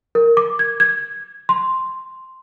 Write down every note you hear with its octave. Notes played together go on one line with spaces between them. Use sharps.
A#4
D6
G#6
G#6
C6